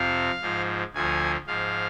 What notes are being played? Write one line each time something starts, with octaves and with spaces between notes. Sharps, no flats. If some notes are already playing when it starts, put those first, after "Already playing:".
Already playing: F2 C3 F3 F5
G#2 F3
D2 D3 F3 G#5
G#2 F3 F5